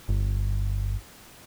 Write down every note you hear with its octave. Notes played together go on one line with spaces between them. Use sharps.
G1